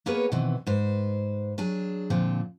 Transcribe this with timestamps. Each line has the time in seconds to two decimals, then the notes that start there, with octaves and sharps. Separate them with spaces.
0.06 A#3 B3 G#4 A#4 B4 C#5
0.32 B2 D#3 E3 C4
0.67 G#2 B4 C5
1.58 F#3 D4 G#4
2.10 A#2 D3 F3 C4